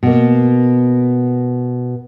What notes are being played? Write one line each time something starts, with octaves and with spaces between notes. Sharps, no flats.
B2 A#3